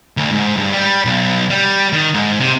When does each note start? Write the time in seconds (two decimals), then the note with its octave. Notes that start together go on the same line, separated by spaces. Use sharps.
0.17 D2
0.32 G#2
0.57 G2
0.73 G3
1.05 B1
1.50 G3
1.93 D#3
2.14 G#2
2.39 C3